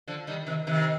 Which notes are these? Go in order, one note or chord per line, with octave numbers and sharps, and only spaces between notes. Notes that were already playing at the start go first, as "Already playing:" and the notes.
D3 F3
D#3 G3
C3 D#3
C3 D#3